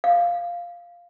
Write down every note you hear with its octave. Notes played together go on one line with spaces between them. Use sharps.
F5